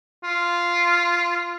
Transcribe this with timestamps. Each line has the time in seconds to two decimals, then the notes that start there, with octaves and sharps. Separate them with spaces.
0.24 F4